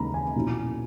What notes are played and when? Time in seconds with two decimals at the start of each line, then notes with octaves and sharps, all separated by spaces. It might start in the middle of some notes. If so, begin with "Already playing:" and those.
Already playing: D#2 C#3 E3 G#3 A#5 B5
0.14 G#5
0.35 B1 A#2 F#3 C#4 E4